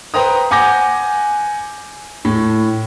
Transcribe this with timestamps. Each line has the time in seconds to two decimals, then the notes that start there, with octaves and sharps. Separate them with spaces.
0.14 B4 C5 G5 A#5 D#6
0.51 F#5 G#5 D6 G6 A#6
2.25 A2